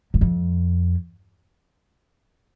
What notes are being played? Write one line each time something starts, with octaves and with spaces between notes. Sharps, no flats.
F#2
F2